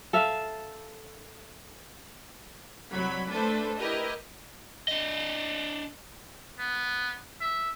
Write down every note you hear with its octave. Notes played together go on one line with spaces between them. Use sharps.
A4 E5 F5
C2 F#3 B5
A3 D4 A4 B4 C5
E4 G4 A#4 B4 D#5
D4 D#5
B3
E5